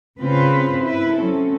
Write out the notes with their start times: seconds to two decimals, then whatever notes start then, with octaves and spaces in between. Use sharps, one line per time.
0.19 C#3 C4 C#4 F4 B4 C5
0.82 E4 B4
1.15 F#3 C4 C#4 A4